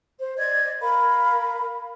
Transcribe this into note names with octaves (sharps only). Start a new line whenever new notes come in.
C5
D5 D#5 G#6
A#4 F5 B5